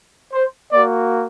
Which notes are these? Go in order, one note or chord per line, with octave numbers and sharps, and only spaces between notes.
C5
A#3 F#4 D5